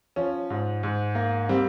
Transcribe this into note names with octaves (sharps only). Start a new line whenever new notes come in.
F3 C#4
G#2
G#2
A#3
G3 C4